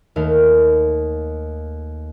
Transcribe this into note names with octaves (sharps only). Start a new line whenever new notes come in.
D#2 A3 F5